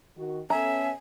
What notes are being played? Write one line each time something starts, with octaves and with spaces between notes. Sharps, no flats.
D#3 F#4
B3 C#4 A4 E5 G#5 A#5